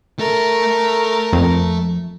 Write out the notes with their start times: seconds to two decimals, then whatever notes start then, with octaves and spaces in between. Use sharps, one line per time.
0.19 A3 A4 A#4
1.33 F2